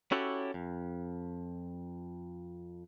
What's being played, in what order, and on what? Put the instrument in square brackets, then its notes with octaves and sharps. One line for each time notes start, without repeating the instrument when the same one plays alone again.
[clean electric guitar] C#4 E4 F#4 G4 A4 C#5
F2